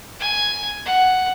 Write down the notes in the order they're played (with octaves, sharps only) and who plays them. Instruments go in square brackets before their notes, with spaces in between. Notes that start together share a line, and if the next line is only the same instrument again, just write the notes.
[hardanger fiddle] G#5
F#5